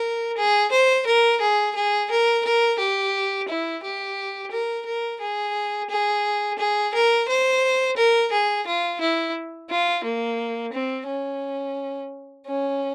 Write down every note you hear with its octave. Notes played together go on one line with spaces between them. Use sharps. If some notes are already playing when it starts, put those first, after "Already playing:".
Already playing: A#4
G#4
C5
A#4
G#4
G#4
A#4
A#4
G4
E4
G4
A#4
A#4
G#4
G#4
G#4
A#4
C5
A#4
G#4
F4
E4
F4
A#3
C4
C#4
C#4